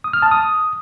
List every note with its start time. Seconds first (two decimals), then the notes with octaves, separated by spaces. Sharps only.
0.04 D#6
0.13 F6
0.22 A5
0.31 D#6